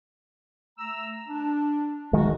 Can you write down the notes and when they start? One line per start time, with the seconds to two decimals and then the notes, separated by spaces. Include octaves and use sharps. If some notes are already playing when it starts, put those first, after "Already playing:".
0.77 A3 A#5 E6
1.27 D4
2.13 D#3 G#3 F#4